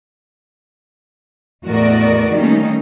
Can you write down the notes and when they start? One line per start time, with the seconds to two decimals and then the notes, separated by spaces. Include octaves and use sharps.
1.66 E2 A2 F#4 A#4 D5 D#5
2.35 D#3 G3 A3 A#3 C#4 D#4